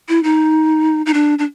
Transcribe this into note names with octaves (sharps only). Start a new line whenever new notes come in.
E4
D#4
D#4
D4
D4